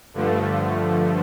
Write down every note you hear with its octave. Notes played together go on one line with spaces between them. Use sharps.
G2 D3 F3 A3